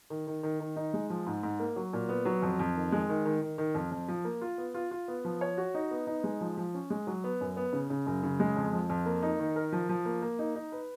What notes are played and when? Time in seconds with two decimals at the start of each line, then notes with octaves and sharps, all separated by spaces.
0.10 D#3
0.27 D#3
0.43 D#3
0.60 D#3
0.76 D#4
0.94 G#3
1.10 F3
1.27 G#2
1.43 G#2
1.59 A#3
1.76 F#3
1.93 A#2
2.09 B3
2.25 F#3
2.42 F2
2.59 F2
2.76 D#3
2.92 G#3
3.09 D#3
3.25 D#3
3.42 D#3
3.58 D#3
3.75 F2
3.91 F2
4.08 F3
4.25 A#3
4.42 F4
4.58 B3
4.74 F4
4.91 F4
5.08 B3
5.25 F3
5.41 C#5
5.58 F#4
5.74 D#4
5.91 B3
6.07 D#4
6.24 G#3
6.41 F3
6.57 F3
6.74 C#4
6.90 G#3
7.07 F#3
7.24 B3
7.41 F#2
7.57 B3
7.73 C#3
7.90 C#3
8.07 F#2
8.23 C#3
8.40 G#3
8.56 F2
8.73 F3
8.90 F2
9.06 A#3
9.23 D#4
9.40 D#3
9.56 A#4
9.72 F3
9.89 F3
10.06 A#3
10.22 A#3
10.39 D#4
10.55 D#4
10.72 B4